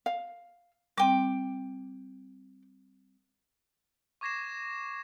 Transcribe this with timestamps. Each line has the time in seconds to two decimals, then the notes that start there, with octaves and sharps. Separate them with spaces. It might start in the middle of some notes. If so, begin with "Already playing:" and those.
0.06 F5
0.97 G3 C4 G5 D6
4.21 C#6 D6 G#6 A#6 C7 E7